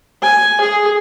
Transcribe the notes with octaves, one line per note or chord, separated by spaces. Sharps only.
G#5
G#4